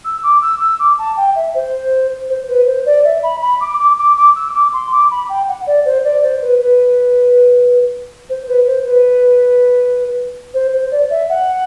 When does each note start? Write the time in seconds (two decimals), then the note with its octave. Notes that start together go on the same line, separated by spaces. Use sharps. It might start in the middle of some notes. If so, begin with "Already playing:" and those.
0.05 E6
0.23 D6
0.42 E6
0.61 E6
0.80 D6
0.99 A5
1.17 G5
1.36 E5
1.55 C5
2.30 C5
2.49 B4
2.67 C5
2.86 D5
3.05 E5
3.23 B5
3.41 B5
3.61 D6
3.80 D6
3.98 D6
4.17 D6
4.36 E6
4.54 D6
4.73 C6
4.92 D6
5.11 B5
5.29 G5
5.48 F#5
5.67 D5
5.85 C5
6.05 D5
6.23 C5
6.42 B4
6.61 B4
8.30 C5
8.48 B4
8.67 C5
8.85 B4
10.54 C5
10.73 C5
10.92 D5
11.10 E5
11.29 F#5